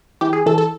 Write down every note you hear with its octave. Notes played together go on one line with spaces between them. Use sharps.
E3 G4
G#4
E3 A4
A4